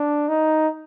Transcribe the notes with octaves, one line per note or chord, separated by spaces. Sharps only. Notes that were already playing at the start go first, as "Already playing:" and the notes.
Already playing: D4
D#4